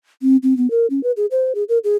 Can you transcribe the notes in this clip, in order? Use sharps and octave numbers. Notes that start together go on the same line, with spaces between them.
C4
C4
B3
A#4
C#4
B4
G#4
C5
G#4
A#4
G#4